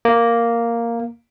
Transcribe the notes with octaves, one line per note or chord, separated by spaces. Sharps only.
A#3